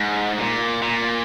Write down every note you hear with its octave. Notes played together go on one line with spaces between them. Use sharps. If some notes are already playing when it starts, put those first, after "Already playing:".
Already playing: G#2
A#2
A#2